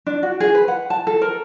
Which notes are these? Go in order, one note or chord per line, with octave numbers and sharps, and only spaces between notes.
D4
F#4
G#4
B4
F#5
A5
A4
A#4